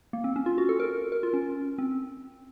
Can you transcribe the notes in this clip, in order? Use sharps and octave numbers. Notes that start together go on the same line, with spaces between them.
A#3
C4
C#4
F4
F#4
A4
A#4
A#4
F4
C#4
C4